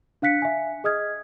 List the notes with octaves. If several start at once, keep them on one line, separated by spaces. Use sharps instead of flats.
D4 F5 F#6 B6 C#7
E5 G#5
G#4 D#5 D#6 F6 G#6